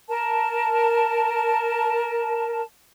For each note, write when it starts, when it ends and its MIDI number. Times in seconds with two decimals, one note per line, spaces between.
0.09 2.61 70
0.09 2.61 81